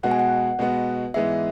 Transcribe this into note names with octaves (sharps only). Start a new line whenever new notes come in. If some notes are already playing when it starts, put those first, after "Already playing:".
B2 G#3 B3 F#4 F#5
G#5
F#5
B2 G#3 B3 F#4
G#2 E3 G#3 B3 G#4 E5